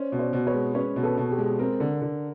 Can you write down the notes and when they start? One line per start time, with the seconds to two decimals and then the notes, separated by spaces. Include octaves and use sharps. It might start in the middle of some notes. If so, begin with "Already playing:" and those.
Already playing: C#4 C5 D5
0.12 B2
0.19 C5 D5
0.33 B2
0.47 B4 C#5
0.54 G#3
0.74 C#4 B4 C#5
0.96 B2
1.03 A4 B4
1.17 B2
1.31 G4 A4
1.38 G#3
1.59 C4 G#4 A#4
1.80 D3
2.02 D3